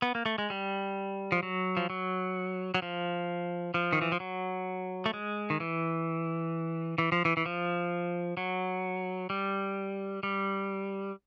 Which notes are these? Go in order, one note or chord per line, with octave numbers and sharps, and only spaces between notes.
B3
A#3
A3
G#3
G3
F3
F#3
F3
F#3
F#3
F3
F3
D#3
E3
F3
F#3
A3
G#3
D#3
E3
E3
F3
E3
E3
F3
F#3
G3
G3